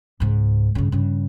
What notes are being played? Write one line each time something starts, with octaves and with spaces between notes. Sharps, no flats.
C#2 G#2
G2 C#3
G2 C#3